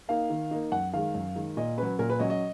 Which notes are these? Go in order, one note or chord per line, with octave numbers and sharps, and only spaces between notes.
A#3 D#4 F5
D#3
A#3 D#4
F#2 F#5
D#3 G#3 F5
F#2
D#3 G#3
A#2 D#5
F#3 C#4 B4
A#2 A#4
B4
F#3 C#4 D#5
D#5